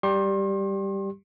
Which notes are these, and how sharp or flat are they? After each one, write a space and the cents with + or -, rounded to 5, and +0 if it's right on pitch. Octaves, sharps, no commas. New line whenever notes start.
G3 +0 G4 +0 C6 +35